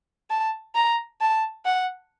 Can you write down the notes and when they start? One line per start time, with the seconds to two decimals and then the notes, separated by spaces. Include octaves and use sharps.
0.30 A5
0.75 A#5
1.21 A5
1.65 F#5